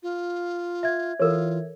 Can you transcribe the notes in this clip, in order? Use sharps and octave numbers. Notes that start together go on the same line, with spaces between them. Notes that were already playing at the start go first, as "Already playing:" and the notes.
F4
E5 G#6
E3 F4 A4 A#4 C#5